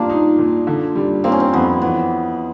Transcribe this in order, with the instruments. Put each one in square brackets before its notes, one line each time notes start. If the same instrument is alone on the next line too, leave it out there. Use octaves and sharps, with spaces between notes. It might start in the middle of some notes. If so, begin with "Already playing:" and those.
Already playing: [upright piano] G3 A#3 [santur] D4 F4
[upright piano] D#4
A#2
D3
G3
[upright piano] A#3 [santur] C4
[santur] C#4
C4
[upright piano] F2 [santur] B3
[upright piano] E3 [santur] B3